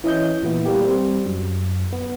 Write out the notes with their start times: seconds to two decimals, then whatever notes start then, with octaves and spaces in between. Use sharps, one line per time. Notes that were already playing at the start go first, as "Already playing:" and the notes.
0.04 E3 C#4 D#5 G6
0.43 A#2 E3 B3
0.65 G3 A#3 G4
0.82 G3 C4
1.26 F#2
1.93 B3